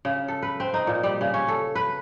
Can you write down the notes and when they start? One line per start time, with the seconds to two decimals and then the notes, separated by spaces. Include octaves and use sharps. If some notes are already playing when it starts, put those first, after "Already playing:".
0.05 C#3
0.28 A4
0.42 B4
0.60 C4
0.74 D#4
0.87 A#2
1.03 G3
1.21 C#3
1.34 C#4
1.48 A4
1.75 B4